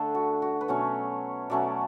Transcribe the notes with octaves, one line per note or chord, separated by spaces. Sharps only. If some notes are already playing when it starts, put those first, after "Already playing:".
Already playing: D3 A3 D4 A4
F#4
F#4
B4
B2 F#3 A3 C#4 C#5
B2 F#3 A3 C#4 D5